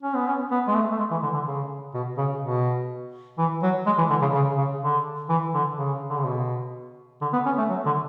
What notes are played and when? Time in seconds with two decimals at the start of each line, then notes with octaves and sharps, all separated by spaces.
0.03 C#4
0.15 B3
0.27 C#4
0.51 B3
0.68 G#3
0.74 A3
0.91 A3
0.99 G#3
1.11 E3
1.23 D3
1.34 D3
1.46 C#3
1.94 B2
2.18 C#3
2.42 B2
3.38 E3
3.63 F#3
3.86 G#3
3.98 E3
4.10 D3
4.22 C#3
4.34 C#3
4.58 C#3
4.83 D3
5.29 E3
5.54 D3
5.78 C#3
6.10 D3
6.18 C#3
6.25 B2
7.21 D3
7.33 B3
7.46 C#4
7.58 A3
7.70 F#3
7.86 D3